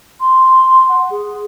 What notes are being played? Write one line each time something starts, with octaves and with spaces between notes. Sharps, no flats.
C6
F#5
G#4